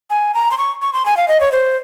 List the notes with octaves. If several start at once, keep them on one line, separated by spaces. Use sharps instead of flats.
G#5
A#5
C6
C#6
C#6
C6
G#5
F5
D#5
C#5
C5